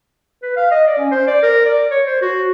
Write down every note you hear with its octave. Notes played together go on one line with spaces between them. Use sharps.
B4
F5
D#5
D5
C#4
C5
D5
A#4
D5
C#5
C5
F#4